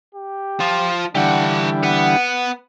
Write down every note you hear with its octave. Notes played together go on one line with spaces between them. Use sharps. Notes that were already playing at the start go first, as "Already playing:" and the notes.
G4
F3 F4
D3 E3 G3 D4 G4 F#5
B3 F#5